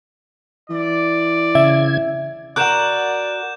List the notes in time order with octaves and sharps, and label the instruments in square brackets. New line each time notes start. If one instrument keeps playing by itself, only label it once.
[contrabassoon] E3 [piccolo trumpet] D5
[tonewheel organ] C#3 G#6 [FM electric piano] E5
[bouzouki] F#4 A#4 [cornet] D5 [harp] F#5 D6 [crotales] F#6 G6 E7